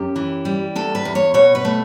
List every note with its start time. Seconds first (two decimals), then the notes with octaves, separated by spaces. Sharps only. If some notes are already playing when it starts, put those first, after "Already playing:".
Already playing: F#2 G4
0.16 E3
0.45 G3
0.76 E2 A4
0.95 B4
1.05 E2
1.15 C#5
1.34 B2 C#5
1.55 B4
1.65 A3